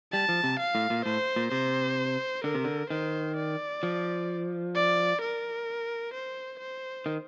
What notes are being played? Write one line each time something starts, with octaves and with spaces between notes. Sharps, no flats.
G3 A5
F3
C3
F5
A2
A#2
A2 C5
A#2
C3 C5
D3 A#4
C3
D3
D#3 C5
D5
F3
D5
A#4
C5
C5
D#3